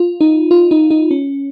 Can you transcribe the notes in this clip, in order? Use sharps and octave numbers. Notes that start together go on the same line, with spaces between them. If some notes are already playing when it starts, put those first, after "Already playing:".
Already playing: F4
D#4
F4
D#4
D#4
C#4